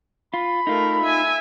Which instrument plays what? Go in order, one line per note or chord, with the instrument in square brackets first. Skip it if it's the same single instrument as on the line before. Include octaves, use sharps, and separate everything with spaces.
[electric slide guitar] F4 [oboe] B5
[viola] A3 A#4 [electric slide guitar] D#4 F4
[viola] E5 G#5